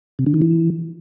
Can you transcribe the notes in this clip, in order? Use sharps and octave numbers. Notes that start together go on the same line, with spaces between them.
C3
D3
D#3
E3